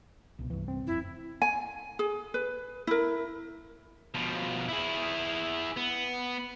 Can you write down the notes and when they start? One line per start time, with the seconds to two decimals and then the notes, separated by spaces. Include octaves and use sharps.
0.39 C2 B2
0.50 C2 G2 E3
0.68 C4
0.87 F1 E4
1.42 G#5
1.99 G#4
2.34 B4
2.87 E4 A#4
4.15 B2 F3
4.69 E4 G#4
5.77 B3